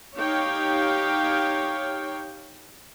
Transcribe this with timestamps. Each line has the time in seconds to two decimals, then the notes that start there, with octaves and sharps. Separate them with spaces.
0.17 D#4 G4 C#5 F5 G5